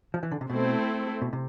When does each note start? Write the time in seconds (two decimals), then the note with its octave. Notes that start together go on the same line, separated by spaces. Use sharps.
0.14 F3
0.23 E3
0.31 D3
0.41 C3
0.50 B2 A3 C4 E4 A4 C5
1.22 B2
1.33 C3